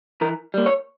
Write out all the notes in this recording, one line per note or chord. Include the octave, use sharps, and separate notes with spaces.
E3 A#4
G3 A#3
C#5